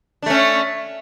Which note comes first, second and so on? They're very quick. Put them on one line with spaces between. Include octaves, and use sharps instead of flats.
D4 A3 C#4